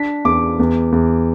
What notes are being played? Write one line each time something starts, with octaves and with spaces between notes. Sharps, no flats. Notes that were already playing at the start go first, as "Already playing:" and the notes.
Already playing: D4 B6
E2 D6
E2
E2